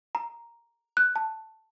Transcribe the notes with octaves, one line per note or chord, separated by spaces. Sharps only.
A#5
F#6
A5